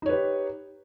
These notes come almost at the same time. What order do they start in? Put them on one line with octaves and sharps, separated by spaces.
D#4 C#5 B4 G4